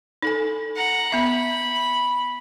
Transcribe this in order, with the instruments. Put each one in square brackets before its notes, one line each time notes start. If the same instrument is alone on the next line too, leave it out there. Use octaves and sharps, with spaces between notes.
[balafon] D#4 A4 G#5
[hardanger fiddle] F#5 A#5
[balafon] B3 E5 [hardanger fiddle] B5